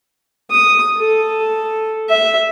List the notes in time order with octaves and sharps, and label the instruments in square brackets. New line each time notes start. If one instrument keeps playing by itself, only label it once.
[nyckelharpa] D#6
A4
E5